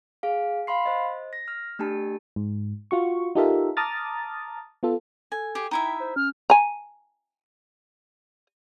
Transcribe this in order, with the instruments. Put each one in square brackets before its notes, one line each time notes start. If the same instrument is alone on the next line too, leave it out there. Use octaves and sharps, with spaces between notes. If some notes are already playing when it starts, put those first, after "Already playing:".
[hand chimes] G#4 F5
F5 B5 C6 C7
C5 D#5
A#6
F6
A3 D4 G4 A5
[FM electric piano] G#2
F4 F#4 C#6
D#4 F4 G4 A4 A#4 E5
A5 A#5 D6 D#6 F6 A6
B3 F4 A4
[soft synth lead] A4 [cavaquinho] G#5
[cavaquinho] G4 G#4
[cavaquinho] D#4 E4 E5 [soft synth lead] G5
[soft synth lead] C5
[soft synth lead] C#4 [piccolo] F6
[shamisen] G#5 A#5